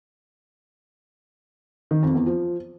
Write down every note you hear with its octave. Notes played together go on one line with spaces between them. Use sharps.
D#3
F2
E2
F3